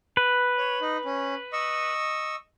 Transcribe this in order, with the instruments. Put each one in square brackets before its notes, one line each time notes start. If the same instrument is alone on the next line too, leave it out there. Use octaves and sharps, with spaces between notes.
[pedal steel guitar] B4
[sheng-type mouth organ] C#5
D#4
C#4
D#5 C#6 E6